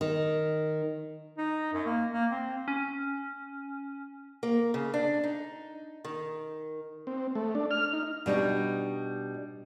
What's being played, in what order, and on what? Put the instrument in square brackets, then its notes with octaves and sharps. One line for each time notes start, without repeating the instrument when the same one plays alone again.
[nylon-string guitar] D#3
[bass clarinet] D#4
F#2
A#3
A#3
C4
[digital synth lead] C#4
[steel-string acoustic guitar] A#3
C#3
D4
D#4
D#3
[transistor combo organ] C4
A3
D4
F6
D#4
[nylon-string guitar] B2 G3 D4 D#4